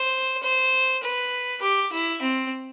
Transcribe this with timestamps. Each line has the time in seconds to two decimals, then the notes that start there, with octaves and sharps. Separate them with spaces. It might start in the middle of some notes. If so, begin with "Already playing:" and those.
Already playing: C5
0.42 C5
1.03 B4
1.62 G4
1.92 E4
2.21 C4